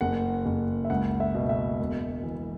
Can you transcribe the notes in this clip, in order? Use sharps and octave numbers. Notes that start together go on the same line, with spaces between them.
F#1 F#5
F#1
E5
C#2 F#5
E5
B2
E5
E1
E3